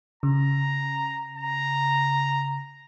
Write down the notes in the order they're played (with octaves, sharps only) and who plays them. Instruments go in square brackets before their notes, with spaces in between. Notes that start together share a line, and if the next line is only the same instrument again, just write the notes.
[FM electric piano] C#3 [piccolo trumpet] A#5
[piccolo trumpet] A#5